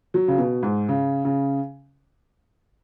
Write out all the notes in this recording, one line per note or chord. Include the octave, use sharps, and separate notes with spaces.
F#3
C#3
B2
G#2
C#3
C#3